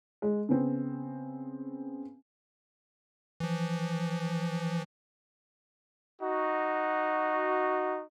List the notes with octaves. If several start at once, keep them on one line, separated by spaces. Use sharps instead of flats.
G#3
C#3 B3 C4
E3 F3
D#4 F#4